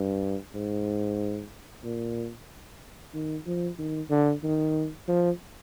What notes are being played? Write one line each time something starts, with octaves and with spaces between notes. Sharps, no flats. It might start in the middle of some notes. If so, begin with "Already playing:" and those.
Already playing: G2
G#2
A#2
D#3
F3
D#3
D3
D#3
F3